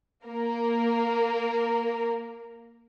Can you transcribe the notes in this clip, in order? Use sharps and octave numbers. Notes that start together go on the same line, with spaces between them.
A#3 A#4